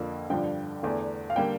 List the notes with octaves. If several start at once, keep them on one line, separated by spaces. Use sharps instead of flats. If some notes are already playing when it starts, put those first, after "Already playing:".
Already playing: F2 D3 F3 A#3
G2 D3 F3 G5
E2 D3 A3
F5
D3 G3 A#3 G5